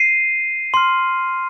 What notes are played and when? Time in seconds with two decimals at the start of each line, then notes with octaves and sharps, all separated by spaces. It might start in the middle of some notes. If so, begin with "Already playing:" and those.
Already playing: C7 D#7
0.74 C6 F6